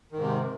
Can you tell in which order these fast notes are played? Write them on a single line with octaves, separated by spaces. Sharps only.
D#3 G#2 C3